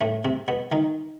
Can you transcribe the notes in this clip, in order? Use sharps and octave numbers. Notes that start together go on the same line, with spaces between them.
A2 A3
C3 C4
B2 B3
D#3 D#4